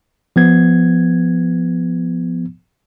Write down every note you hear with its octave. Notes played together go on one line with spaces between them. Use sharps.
F3 B3 G#6